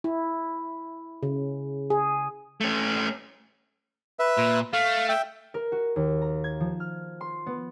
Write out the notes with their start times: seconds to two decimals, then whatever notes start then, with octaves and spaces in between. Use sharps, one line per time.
0.04 E4
1.23 C#3
1.90 G#4
2.61 A3 C#4
4.19 B4 E5
4.38 A#2
4.73 A3 F5
5.09 E5 G5
5.54 A#4
5.72 F#4
5.96 D#2
6.22 A#5
6.44 G#6
6.60 F3
6.80 F6
7.21 C6
7.46 B3